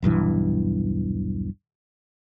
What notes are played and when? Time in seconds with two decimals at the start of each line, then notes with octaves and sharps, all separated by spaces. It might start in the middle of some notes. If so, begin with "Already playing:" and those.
0.02 D#1 B1 G2 E3